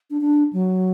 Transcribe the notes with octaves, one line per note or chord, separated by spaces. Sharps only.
D4
D4
F#3